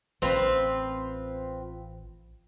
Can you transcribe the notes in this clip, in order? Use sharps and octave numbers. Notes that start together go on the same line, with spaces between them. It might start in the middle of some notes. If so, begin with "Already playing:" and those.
A1 C4 F4 B4